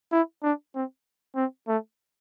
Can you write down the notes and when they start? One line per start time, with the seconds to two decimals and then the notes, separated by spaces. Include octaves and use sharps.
0.12 E4
0.43 D4
0.74 C4
1.36 C4
1.68 A3